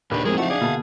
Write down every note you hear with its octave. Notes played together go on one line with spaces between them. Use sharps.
D#2 A#2 D4 B4
A2 F3 G#3 C4 G#4 A#4
E3 F#3 A3 D#4 F5 F#5
D4 G#4 D5
B2 D3 A#3 A5